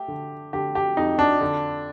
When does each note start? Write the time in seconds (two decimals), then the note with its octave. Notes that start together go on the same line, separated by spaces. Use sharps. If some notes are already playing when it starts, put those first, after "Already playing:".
Already playing: A3 G4
0.08 D3
0.53 D3 G4
0.75 G4
0.97 F2 D#4
1.19 D4
1.41 D3